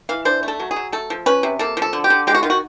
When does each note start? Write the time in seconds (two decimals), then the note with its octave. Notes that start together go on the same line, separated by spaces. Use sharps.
0.09 E3 F5
0.25 D4 C5
0.43 A3
0.48 A4
0.60 F#3
0.71 G#4
0.76 F#3
0.92 A3 A4
1.10 F3
1.26 C#4 B4
1.43 C3
1.59 A#3 A4
1.77 F3
1.82 A4
1.93 D3
2.04 G4
2.10 D3
2.27 G#3 G4
2.35 F#4
2.43 D#3 F4
2.50 F#4